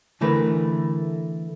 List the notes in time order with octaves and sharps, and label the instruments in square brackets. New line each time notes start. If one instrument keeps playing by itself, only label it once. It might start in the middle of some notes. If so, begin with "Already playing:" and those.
[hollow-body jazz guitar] D3 E3 A3 A#4 B4